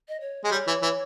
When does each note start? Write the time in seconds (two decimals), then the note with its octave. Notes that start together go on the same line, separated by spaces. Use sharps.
0.08 D#5
0.21 C#5
0.44 G#3
0.51 G3 C#5
0.67 E3
0.83 E3